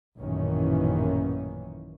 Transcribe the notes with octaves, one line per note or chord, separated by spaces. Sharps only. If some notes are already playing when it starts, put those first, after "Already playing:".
A1 F#2 A#2 D#3 E3 C#4